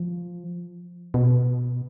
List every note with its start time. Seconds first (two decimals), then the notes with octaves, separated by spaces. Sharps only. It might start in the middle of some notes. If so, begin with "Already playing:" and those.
Already playing: F3
1.14 B2